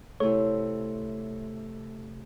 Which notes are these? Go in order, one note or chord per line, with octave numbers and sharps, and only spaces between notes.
C3 A3 E4 A4 C#5